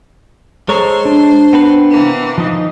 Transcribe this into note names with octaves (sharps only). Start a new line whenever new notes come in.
G#3 A4 C5 C#5 A#5 C#6
D4
B3 C4 B4
C3 E3 A#3
F3 D#4